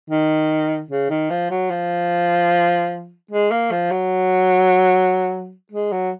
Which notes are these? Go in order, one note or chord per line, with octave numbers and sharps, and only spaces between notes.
D#3
C#3
D#3
F3
F#3
F3
G#3
A#3
F3
F#3
G#3
F#3